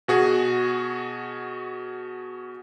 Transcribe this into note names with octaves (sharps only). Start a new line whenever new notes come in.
B2 F#4 G#4